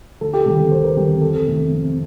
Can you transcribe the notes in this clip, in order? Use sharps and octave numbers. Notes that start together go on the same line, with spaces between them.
D2 A4
G4
C3 D#3 G3 A4
A4
D2 C5
A#4
C3 D#3 G3 G4
F2 A4
C3 D#3 A3
F2